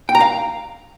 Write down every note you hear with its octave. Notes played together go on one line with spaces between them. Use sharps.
G5
A#5
F5